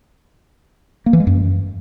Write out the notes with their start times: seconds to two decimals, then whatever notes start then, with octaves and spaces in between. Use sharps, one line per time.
1.06 A#3
1.13 E3
1.20 G#3
1.27 F#2